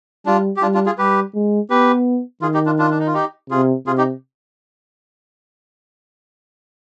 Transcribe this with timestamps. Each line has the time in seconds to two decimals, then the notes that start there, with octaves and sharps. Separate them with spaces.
0.26 G3 D4 F4
0.57 G4
0.62 G3 D4 F4
0.74 D4 F4
0.86 F4 G#4
0.98 G3 G4 B4
1.35 G#3
1.70 B3 G4 B4
2.42 D#3 F4 G#4
2.54 D#4 G4
2.66 D4 F4
2.79 D4 F4
2.91 D4
2.99 D#4
3.07 F4
3.14 D#4 G4
3.50 C3 F4 G#4
3.87 C3 F4 G#4
3.98 D#4 G4